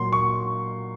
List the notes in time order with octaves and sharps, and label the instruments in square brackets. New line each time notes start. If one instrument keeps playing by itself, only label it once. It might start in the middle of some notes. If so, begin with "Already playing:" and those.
Already playing: [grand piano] A#2 F#3 C6
C#6